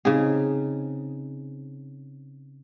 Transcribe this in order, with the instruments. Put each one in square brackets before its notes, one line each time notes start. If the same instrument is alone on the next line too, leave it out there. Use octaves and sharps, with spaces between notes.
[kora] C#3 G#4 [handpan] C4 D#4